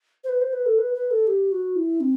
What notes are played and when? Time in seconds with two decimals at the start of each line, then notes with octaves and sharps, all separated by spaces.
0.24 C5
0.29 B4
0.41 C5
0.53 B4
0.66 A4
0.78 B4
0.94 B4
1.11 A4
1.27 G4
1.52 F#4
1.76 E4
2.01 C4